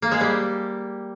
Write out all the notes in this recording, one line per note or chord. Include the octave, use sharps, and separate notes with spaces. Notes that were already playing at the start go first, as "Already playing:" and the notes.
A#3
G#3
G3